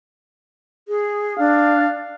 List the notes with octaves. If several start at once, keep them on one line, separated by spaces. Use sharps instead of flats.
G#4
D4 F5